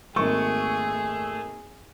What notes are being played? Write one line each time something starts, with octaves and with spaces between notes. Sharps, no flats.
G#1 A3 A#3 G#4 C#6